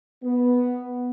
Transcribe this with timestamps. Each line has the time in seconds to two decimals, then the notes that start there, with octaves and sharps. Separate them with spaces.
0.24 B3